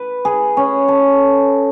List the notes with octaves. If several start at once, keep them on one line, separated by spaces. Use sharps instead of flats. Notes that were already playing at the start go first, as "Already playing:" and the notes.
Already playing: B4
G#4
C#4
A4